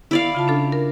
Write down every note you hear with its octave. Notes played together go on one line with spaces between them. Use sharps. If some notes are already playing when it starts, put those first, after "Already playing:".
E4 D5 F5
C#3 F4 A5
C#4 D4 A4
A#4